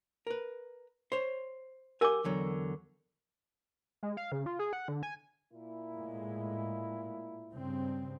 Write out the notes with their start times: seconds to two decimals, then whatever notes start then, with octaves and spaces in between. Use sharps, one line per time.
0.27 A#4 B4
1.12 C5 C#5
2.01 G4 A#4 F#5 G#5 D6
2.24 E2 D3 F#3
4.03 G#3
4.17 F5
4.32 C#3
4.46 F4
4.59 G#4
4.73 F#5
4.88 D3
5.03 G#5
5.51 A#2 A#3 E4
5.92 A2 G#3
7.52 G2 C#3 C4